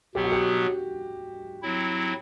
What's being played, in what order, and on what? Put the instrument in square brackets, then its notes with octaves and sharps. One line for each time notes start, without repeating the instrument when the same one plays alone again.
[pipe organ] B2 F#3 B3 [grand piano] G4
[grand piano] F#4
G4
[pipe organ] F#3 C4 E4